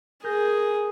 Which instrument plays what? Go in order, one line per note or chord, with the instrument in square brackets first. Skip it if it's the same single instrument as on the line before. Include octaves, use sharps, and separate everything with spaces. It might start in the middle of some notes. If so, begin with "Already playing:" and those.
[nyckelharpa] G#4 [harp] A#4 G6 A#6